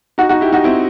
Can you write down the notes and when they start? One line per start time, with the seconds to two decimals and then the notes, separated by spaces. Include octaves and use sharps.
0.18 D#4 F#4
0.29 D#4 F#4
0.41 E4 G4
0.52 D#4 F#4
0.64 C4 E4